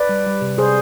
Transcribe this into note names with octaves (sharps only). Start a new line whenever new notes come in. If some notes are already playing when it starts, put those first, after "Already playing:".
Already playing: B4 D5
G3
G3
C3
C3 G#4 C5